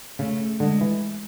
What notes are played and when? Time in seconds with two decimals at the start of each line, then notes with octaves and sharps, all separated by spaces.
0.19 C#3 A3
0.60 D3 G#3
0.81 E3